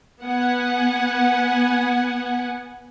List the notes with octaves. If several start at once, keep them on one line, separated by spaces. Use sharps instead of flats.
B3 F#5 G#5